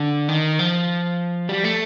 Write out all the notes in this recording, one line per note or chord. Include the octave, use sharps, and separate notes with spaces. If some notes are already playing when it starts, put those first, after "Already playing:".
Already playing: D3
D#3
F3
G3
A3